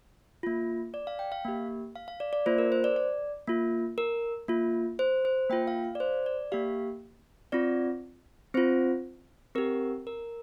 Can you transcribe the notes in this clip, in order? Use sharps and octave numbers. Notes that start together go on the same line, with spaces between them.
A#3 F4
D5
F5
G5
F5
A#3 G4
F5
F5
D5
D5
A#3 F4 C5
A#4
C5
D5
D5
A#3 F4
A#4
A#3 F4
C5
C5
A#3 F4 G5
F5
F5
D5
C5
D5
A#3 G4 F5
C4 F4 D5
C4 F4 C5
C4 G4 A#4
A#4